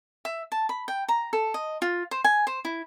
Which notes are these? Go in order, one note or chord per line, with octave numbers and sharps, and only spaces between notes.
E5
A5
B5
G5
A#5
A4
D#5
F4
C5
G#5
C5
E4